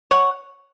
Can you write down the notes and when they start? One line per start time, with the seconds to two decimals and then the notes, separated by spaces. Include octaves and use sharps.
0.11 C#5 F#5